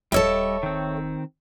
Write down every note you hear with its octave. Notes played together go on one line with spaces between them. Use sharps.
D#1 G3 A4 C#5 D#5 E5 E6
D#3 C4